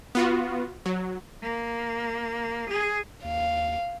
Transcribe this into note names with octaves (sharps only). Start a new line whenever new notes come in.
B3 F4 F#4
F#3
A#3
G#4
D#2 F5